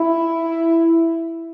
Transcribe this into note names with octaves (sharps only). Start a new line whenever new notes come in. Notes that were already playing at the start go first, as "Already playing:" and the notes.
Already playing: E4